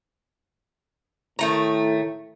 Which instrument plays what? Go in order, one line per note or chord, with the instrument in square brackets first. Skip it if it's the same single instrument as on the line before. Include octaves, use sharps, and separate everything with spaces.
[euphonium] A2 [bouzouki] D#3 A3 A#5